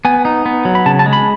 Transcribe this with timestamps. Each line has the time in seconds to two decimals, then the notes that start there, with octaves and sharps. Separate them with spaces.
0.05 B3 G#5
0.25 D#4
0.46 B3
0.65 F#3
0.75 B5
0.86 C#3 A5
0.99 A5
1.06 G#3
1.13 B5